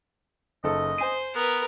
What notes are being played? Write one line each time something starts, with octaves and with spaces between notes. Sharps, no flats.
F#1 D#4 A4 D#5
C5 G#5 D#7
B3 A#4 B4